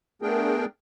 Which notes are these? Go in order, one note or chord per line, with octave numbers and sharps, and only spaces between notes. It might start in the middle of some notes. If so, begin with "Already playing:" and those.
A3 B3 D4 G#4 A#4 G5